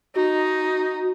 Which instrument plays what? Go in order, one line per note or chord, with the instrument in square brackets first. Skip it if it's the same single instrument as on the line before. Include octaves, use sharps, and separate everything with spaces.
[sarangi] D#4 [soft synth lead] F#4